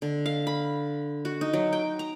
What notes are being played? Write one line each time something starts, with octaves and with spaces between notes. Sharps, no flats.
D3
F5
B5
F#4
D#4
F#3
G5
A#5